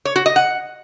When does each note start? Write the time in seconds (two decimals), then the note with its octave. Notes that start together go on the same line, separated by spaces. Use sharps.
0.05 C#5
0.16 F#4
0.26 D#5
0.36 F#5